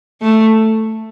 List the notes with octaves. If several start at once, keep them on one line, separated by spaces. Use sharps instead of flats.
A3